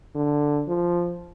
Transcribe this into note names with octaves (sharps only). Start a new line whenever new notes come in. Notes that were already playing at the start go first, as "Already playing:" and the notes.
D3
F3